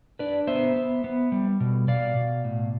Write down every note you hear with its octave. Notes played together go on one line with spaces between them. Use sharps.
D4 B4 D5
B3 C5 E5
B3
B3
G3
B2
B2 D5 F5
B2
A2